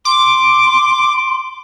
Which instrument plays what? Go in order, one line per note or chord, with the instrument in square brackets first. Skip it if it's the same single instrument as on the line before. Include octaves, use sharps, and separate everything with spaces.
[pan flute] C6 [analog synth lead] D6